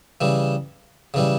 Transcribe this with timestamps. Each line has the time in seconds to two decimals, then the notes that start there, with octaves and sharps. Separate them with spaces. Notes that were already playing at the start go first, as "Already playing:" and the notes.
0.21 C#3 E3 G3
1.14 C#3 E3 G3